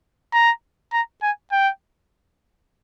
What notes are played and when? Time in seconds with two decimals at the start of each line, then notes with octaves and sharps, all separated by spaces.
0.33 A#5
0.93 A#5
1.22 G#5
1.52 G5